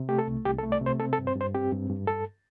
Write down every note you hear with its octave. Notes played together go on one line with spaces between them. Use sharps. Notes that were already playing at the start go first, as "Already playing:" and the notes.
Already playing: C3
A3 G4
A4
C2
C2 G4
A4
A3
D5
C3
C5
C4 A4
A4
G2
C5
G2
C5
C4 G4
G2
G2
G2 A4